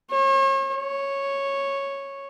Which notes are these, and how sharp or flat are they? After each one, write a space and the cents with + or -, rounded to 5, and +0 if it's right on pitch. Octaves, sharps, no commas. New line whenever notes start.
C#5 -40
C#5 -5